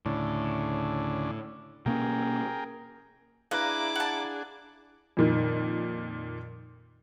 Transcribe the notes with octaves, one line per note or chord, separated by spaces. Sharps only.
D2 A2 C#3 D4
B2 A#3 C#4 G#4 A#4 G5
D4 E4 G#4 B4 F5 A#5 D6
F#5 A5
F2 A#2 D#3